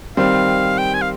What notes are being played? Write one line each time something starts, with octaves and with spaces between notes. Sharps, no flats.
D#3 G3 C4 F5
G5
G#5
F5